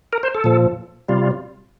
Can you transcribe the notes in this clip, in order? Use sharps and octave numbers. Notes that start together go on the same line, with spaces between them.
A#4
C5
A4
A#2 F3
C3 G3 F4